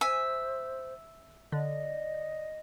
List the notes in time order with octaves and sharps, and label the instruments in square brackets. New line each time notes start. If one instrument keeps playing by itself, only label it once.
[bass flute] C5 [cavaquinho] E5 [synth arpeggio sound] G#5
[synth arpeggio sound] D3 [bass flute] D5 [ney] D#5